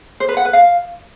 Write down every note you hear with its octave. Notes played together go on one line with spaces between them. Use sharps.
C5
B4
F#5
B4
F5